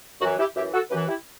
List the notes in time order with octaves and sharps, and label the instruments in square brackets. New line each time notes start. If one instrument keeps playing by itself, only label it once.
[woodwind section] F#2 E3 F#4
E4 G4
F#2 E3 E4 G4
F#4 A4
F#2 G4 B4
E3
E4 G4